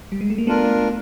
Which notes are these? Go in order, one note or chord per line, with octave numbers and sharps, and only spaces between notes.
G3
G#3
A3
A#3
A3 B3 D4 F4 A#4